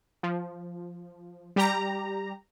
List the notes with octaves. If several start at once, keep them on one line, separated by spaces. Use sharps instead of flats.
F3
G3 G4 A#5